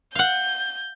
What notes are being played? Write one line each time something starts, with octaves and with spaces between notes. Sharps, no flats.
F5 F#5 G6